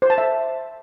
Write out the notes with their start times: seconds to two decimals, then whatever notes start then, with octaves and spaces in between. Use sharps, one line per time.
0.02 C5
0.10 A5
0.18 E5